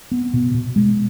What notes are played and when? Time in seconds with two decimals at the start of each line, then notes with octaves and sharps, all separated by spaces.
0.12 B3
0.34 B2
0.55 B2
0.76 G#3